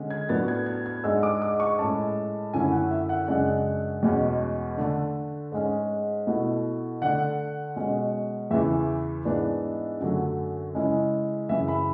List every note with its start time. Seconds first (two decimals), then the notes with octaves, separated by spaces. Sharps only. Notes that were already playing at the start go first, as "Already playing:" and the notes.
Already playing: D3 G#3 C#4
0.10 G#6
0.29 A2 F#3 B3 D4 A6
0.48 G#6
0.66 G#6
0.86 G#6
1.04 G#2 G#3 D4 E6
1.23 D6
1.42 D6
1.60 C#6
1.79 A2 G#3 C#4 A5
2.54 F#2 D3 A3 C#4 E4 G#5
2.72 F#5
2.91 E5
3.09 F#5
3.28 F#2 C#3 G#3 D4 F#5
4.03 E2 B2 G#3 C#4
4.78 D3 A3 D4
5.52 G#2 G#3 C#4
6.27 B2 A3 E4
7.01 D3 A3 D4 F#5
7.76 B2 G#3 C#4
8.51 E2 C#3 E3 E5
9.25 G#2 E3 B3 D4
10.00 F#2 D3 F#3 A3
10.75 C#3 G#3 C#4 E4
11.49 F#2 C#3 E3 E5
11.68 B5